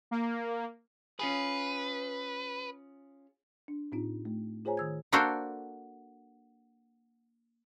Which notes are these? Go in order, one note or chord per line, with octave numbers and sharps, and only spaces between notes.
A#3
C#4 F4 G#4 B4
D4
A2 C4 D#4 F4
A3
F4 G#4 C5 C#5 G#5 A#5
D#3 E6 G#6
A#3 D4 F#4 A4 A#4 C5